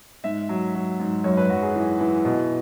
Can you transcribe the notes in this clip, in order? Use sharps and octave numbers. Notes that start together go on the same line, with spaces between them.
G#2 E5
F#3
F#3
G#2
F#2 C#5
B4
F#2 F#4
G#4
E3
E3
B2